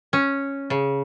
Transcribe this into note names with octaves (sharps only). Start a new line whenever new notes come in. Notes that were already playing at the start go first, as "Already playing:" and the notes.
C#4
C#3